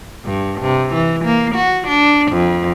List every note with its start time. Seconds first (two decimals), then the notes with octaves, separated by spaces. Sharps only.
0.25 G2
0.61 C3
0.94 E3
1.25 A#3
1.55 F#4
1.88 D4
2.32 F2